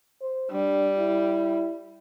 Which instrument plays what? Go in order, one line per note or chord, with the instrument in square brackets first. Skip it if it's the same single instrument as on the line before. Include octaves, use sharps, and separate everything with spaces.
[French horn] C5
[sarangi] G3 [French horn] D4
[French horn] E4